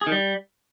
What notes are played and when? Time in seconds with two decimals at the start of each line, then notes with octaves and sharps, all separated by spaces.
0.01 G#4
0.07 D#3
0.12 G3